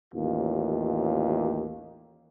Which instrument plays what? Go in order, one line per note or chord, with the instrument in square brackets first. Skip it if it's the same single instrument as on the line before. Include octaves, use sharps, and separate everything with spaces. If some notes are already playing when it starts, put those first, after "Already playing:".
[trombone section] A1 D#2 F4